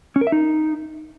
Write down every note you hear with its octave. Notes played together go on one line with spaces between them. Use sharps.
C#4
A#4
E5
D#4